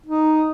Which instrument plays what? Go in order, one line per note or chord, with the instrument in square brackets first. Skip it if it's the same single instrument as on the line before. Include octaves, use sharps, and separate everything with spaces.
[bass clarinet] D#4